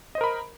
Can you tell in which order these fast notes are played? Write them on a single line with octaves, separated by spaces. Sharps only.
D#5 C5 A#4 B5